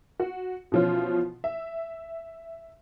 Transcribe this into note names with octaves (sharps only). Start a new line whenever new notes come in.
F#4
B2 E3 F3 C#4 F4
E5